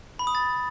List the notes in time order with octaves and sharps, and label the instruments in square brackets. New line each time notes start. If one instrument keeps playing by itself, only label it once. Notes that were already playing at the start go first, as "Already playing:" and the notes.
[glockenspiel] B5
D#6
A6